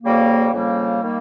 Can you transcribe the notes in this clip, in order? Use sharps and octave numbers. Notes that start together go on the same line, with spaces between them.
F2 C#3 G3 A#3
F2 C#3 G3 A#3
D#3 G3 A#3